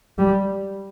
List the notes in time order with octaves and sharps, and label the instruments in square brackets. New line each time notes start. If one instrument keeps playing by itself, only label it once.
[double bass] G3